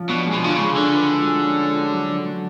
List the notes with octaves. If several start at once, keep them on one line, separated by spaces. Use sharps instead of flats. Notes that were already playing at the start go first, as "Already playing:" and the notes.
Already playing: F3 C#4
B2 D4
G#3
B2
D3 F4
C#3 G#3
D3 D4
B4
F#4
G#3
C#4
A4
F#4
F#3
D4
A3